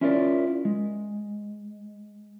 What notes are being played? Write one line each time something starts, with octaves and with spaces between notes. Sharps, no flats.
C#4 E4 F4 A#4 C5 D5
G#3